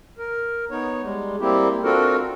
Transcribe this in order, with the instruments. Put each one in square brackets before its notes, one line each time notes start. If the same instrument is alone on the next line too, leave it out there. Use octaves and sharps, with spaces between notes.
[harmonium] A#4
B3 D#4 C#5
G3 G#3
G3 A#3 C4 E4 G4
C4 D4 F4 F#4 A4 A#4